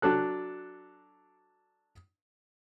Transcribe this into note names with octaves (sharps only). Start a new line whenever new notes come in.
F#3 D4 A4 F#6